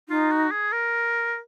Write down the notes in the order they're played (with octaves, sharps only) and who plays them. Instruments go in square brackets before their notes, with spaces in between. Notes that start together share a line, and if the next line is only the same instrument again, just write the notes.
[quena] D#4 [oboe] F4
[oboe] F#4
G#4
A#4